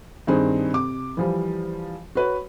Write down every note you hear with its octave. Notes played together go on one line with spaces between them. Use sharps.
G2 D#3 C4 G#4
C3 D6
E3 F3 G3
F#4 B4 C#5